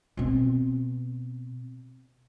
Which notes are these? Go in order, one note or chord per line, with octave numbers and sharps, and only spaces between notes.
B2 C4